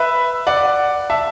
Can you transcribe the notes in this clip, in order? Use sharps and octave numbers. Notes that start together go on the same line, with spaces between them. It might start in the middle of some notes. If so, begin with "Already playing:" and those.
Already playing: B4 E5
D5 F#5
E5 A5